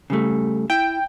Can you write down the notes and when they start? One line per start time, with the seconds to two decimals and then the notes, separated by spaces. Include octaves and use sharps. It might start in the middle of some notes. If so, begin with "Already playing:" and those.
0.10 C#3 G3 A3
0.70 E4 G5